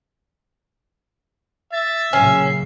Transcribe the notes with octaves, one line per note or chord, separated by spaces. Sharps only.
E5 A6
A#2 C#3 F#3 C#4 C7